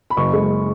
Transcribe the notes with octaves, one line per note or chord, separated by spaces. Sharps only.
B5
F#1 C#6
G#3